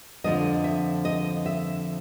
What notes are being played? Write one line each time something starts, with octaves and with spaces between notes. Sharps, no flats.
F2 D3 F3 D#5
E5
D#5
E5